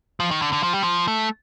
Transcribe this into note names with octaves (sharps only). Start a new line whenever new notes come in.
F3
D#3
D3
D3
F3
G3
F3
A3